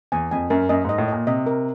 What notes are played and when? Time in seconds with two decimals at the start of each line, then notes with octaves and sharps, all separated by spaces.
0.12 E2 G#5
0.31 F2 G#5
0.50 F#2 A#4
0.69 F#2 D#5
0.85 G#2 D#5
0.98 A2
1.08 A#2 D#5
1.27 C3 D#5
1.46 A#4